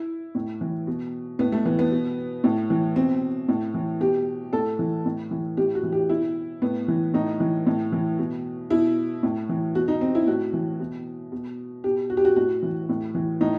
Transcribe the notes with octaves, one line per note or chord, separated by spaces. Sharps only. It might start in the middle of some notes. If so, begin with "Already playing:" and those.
Already playing: E4
A2
E3
B2
A2 B3
A3
E3 B3
B3
B2
A2
E3
B2 C4
A2
E3
B2 G4
A2 A4
E3
A2
E3
A2 G4
F#4
E3
G4
B2 E4
A2 B3
E3
A2 D#4
E3
A2
E3
B2
B2 E4
A2
E3
B2 F#4
D#4
C4
E4
A2 F#4
E3
B2
B2
B2 G4
F#4
G4
F#4
A2 F#4
E3
A2
E3
A2 D#4